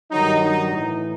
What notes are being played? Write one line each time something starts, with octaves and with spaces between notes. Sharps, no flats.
G2 D#3 F#3 D#4
D#4
A2 E3 D#4